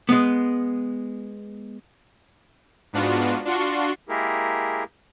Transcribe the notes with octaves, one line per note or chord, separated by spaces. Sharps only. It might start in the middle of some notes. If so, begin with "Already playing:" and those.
G#3 B3
G#2 B3 D4 F4 F#4
D4 F4 F#4 C6 C#6
G#3 A#3 E4 G4 G#4 A#4